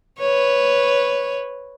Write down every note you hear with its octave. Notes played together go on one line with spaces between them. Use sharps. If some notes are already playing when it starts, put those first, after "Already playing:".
B4 C#5